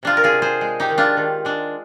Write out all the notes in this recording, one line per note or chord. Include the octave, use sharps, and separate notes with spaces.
C3 D4 F4
A#4
F4 G#4
C3
G#4 C5
G#3
D#4 G4
D#3
D4 F4
D#3
G#3 D4